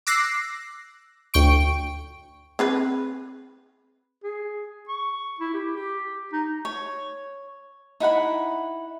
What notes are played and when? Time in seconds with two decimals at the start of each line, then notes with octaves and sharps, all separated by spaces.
0.07 D6 E6 F#6 A#6 C7
1.34 D2 G5 C#6 D7
2.59 C4 G#4 B4
4.24 G#4
4.88 C#6
5.40 E4
5.54 G4
5.76 G4
6.33 D#4
6.65 C#5
8.00 D#4 E4 F#5 B5